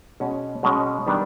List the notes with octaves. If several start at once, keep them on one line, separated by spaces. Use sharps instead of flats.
B2 G#3 C#4
B2 G#3 C#4
D#3 G3 B3 D4